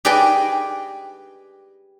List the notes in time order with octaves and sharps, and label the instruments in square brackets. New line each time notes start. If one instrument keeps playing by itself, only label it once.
[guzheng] G4 G#4 B4 D5 D#5 G5